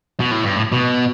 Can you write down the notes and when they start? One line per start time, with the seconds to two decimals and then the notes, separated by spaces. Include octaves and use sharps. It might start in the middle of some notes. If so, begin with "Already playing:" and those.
0.20 B2
0.31 A2
0.44 G2
0.56 A2
0.72 B2